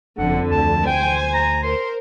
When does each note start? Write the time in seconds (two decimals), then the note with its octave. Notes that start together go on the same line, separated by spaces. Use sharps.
0.19 F#1 F2 D3 F#5
0.51 D2 A5
0.86 C5 G5 G#5
1.34 A#5
1.63 A#4 C5 C6